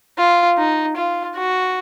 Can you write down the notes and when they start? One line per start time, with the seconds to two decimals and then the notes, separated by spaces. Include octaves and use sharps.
0.18 F4
0.58 D#4
0.97 F4
1.36 F#4